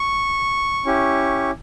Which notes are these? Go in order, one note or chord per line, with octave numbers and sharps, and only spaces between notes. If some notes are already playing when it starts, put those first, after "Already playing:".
Already playing: C#6
C#4 E4 G4